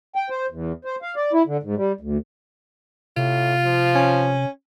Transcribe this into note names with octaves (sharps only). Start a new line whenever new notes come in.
G5
C5
E2
C5
F5
D5
E4
D3
G#2
G3
D2
A2 C3 F4
F3
C#4